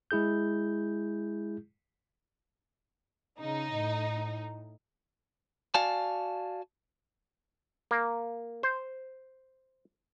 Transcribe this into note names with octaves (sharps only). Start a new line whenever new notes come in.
G#3 E4 G#4 G6
C#3 D#4
A2
F#4 D5 F5 G#5 A5
A#3
C5